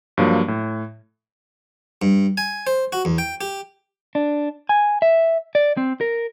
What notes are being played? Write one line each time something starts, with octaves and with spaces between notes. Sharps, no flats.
G2 F3 F#3 A#3
A2
G2
G#5
C5
F#4
E2
G5
G4
D4
G#5
E5
D5
C4
A#4